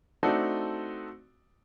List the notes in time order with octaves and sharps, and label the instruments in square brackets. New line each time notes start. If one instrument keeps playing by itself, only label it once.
[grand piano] A3 C4 D4 D#4 F#4 A4